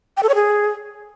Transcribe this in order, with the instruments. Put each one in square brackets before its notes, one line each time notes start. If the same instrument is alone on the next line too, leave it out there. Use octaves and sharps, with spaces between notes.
[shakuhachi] G5
A4
C#5
G#4